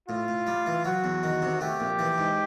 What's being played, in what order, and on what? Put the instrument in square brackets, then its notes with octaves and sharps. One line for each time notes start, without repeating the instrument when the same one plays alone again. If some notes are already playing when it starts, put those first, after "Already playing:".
[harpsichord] A2 [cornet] F4
[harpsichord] A2
G3
E3
[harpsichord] F#3 [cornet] F#4
[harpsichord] E2
D#3
C3
[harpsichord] A3 [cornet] G4
[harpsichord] A#1
E3
G#2